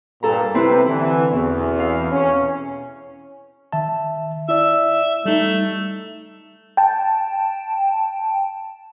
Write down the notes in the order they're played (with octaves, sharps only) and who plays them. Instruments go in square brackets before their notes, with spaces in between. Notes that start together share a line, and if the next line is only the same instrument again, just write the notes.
[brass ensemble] G2 A#2 [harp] A4 A#5
[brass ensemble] C3 B4 [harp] C4 E4
[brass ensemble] D3 E3 [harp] E4
[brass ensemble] E2 [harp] B2
[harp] F5
[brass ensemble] C#4
[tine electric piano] D#3 E5 A5
[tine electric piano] E4 D5 [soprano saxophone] E5
[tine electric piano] G3 D#4 [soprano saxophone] A3
[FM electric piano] G5 A5